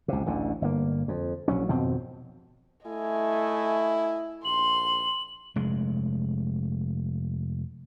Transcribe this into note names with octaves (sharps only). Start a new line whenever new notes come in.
C#2 C3
A1 D2 D3
G1 A#3
F2
A#1 F#3 C#4
G#1 F2 B2 C4
A3 E4 D#5 G#5
A#1 C6 F#7
F1 G#3